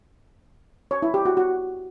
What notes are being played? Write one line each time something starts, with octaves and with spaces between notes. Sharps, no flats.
C#5
E4
G4
F#4
F#4